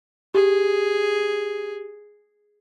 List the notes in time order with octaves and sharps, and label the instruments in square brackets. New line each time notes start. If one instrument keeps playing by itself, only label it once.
[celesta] G4 [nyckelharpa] G#4